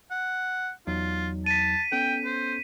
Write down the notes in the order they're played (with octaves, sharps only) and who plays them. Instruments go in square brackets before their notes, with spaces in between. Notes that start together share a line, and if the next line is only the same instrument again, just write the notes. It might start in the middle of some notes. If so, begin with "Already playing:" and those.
[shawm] F#5
[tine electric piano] E2 F#3 D#4 [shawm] F4
[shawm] A5 [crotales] B6 D#7
[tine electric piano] B3 C#4 A4 [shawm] G5
[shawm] C5